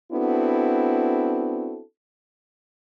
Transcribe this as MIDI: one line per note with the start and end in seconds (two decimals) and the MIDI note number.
0.12 1.81 59
0.12 1.81 60
0.12 1.81 62
0.12 1.81 64
0.12 1.81 66
0.12 1.81 69